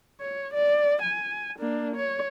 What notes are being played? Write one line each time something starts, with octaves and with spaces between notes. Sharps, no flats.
C#5
D5
G#5
A#3 D4
C#5